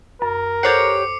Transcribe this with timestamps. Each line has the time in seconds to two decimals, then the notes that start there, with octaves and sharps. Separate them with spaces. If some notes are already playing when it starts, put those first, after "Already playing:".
0.22 F#2 A#4
0.63 G4 A4 C5 C#5 F#5 D6 C7 C#7